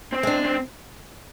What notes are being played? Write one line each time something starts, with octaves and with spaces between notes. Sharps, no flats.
C4
G#3 D4
C4